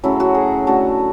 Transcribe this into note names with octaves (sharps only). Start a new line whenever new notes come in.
C#3 F#3 A3 E4
F#4
G#4
D3 A3 F#4